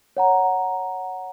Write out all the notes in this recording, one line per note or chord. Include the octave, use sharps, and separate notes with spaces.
C#5 F#5 A#5